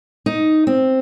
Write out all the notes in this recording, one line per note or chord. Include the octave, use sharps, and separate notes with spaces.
D#4
C4